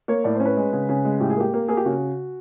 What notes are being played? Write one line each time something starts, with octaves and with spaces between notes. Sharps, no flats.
A#3 C#5
A2 D5
C5
C#4
B4
G#3
C#3
C#3
G#3
A2 G4
G#4
A#3 G4
A#3
A#3 G#4
G4
C#3 F#4